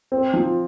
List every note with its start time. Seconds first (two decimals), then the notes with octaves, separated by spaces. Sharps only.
0.12 C4
0.34 F3